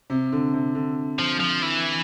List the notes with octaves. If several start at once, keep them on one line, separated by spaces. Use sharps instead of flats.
C3
D3
C3
D3
F3
F3
E3